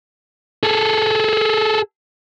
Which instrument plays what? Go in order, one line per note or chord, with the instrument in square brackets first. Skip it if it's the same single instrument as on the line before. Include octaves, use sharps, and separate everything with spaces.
[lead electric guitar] G#4 A4